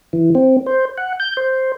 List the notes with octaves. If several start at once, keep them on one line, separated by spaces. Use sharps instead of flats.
E3
C4
C5
F#5
G6
C5